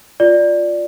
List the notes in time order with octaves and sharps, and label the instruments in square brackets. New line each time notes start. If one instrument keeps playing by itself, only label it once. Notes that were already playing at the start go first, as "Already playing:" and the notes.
[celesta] F4 D5